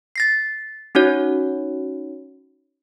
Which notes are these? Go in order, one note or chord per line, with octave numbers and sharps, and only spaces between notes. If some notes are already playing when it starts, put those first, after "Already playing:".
A6 A#6 C7
C#4 D#4 F#4 C#5